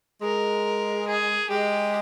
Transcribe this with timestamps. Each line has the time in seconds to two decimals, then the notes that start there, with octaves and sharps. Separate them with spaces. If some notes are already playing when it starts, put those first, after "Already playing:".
0.22 G#3 A#4
1.08 G#4
1.50 G#3 G4